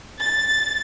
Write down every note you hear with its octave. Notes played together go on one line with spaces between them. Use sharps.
A6